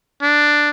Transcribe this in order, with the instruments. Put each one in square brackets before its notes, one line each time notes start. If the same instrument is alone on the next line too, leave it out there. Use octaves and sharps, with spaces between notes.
[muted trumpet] D4